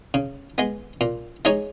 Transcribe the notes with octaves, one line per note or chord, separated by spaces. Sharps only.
C#3
G#3 B3
A#2
G#3 D#4 G#4 C#5